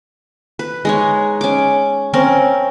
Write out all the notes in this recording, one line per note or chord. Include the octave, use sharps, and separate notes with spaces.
B4
G#3 D#4 C#5
C#4 D6
C4 C#4 A#4